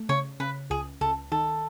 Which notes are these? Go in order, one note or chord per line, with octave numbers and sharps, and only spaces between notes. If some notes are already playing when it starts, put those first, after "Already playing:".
Already playing: A3
C#3 C#5
C#3 B4
C#2 G#4
C#2 A4
D#3 A4